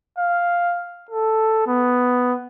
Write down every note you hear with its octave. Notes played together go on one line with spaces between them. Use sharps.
F5
A4
B3